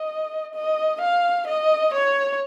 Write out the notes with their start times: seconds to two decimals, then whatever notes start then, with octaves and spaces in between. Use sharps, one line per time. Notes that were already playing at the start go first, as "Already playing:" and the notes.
Already playing: D#5
0.55 D#5
1.01 F5
1.47 D#5
1.93 C#5